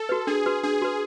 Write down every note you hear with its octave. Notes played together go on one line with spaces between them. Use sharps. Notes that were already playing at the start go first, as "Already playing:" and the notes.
Already playing: A4
F#4 B4
D4 G#4
F#4 B4
D4 G#4
F#4 B4